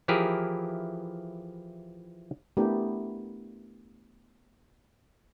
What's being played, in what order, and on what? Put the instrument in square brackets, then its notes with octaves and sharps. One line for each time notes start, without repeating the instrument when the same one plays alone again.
[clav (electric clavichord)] E3 F3 E4 G4 G#4 A#4
[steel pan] A3 B3 D4 E4 G4 A#4